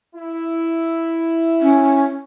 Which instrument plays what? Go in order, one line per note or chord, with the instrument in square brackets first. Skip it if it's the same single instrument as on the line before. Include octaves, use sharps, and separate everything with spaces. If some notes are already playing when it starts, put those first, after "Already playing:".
[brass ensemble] E4
[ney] C#4